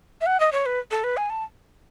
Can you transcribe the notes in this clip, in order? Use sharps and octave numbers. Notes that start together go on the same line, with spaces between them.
E5
F#5
D#5
C#5
B4
A4
B4
G#5
A5